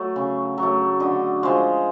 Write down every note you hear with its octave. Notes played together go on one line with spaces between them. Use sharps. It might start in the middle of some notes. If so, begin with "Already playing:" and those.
Already playing: F#3 A3
C#3
F#3
A3
D3 D#5
F3 G#3